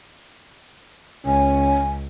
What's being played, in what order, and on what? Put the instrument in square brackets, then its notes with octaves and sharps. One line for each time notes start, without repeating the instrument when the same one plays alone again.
[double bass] C#2 [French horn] C#4 [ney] G#5